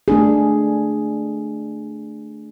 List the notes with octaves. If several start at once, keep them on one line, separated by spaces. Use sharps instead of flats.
A3 D4 G#4